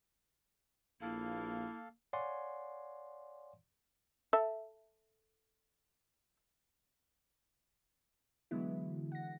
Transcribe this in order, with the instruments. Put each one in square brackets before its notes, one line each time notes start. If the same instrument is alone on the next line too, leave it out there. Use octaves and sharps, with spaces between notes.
[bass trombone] A#1 [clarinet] A#3 [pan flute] E4 [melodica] A4 F5
[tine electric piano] C#5 D5 F5 F#5 G#5 C6
[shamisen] A4 E5
[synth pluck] D3 E3 F#3 G#3 B3 E4
F#5 A#6